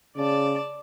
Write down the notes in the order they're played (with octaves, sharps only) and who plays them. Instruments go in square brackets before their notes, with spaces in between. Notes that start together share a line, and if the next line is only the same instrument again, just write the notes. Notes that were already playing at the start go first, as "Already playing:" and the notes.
[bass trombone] C#3 [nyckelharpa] D5 A5